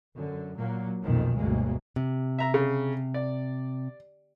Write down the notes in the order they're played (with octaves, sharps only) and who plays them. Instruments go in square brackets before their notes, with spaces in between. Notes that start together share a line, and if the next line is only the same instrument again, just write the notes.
[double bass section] F#2 D3
A#2 F#3 A#3
B1 F2 A#2 D#3 F3
G1 D2 B2 G#3 A#3
[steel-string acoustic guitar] C3
[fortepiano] E5 A#5
C#3
D5